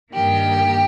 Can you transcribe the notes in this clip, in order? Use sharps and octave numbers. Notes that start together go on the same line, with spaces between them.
G2 D#3 A#3 G4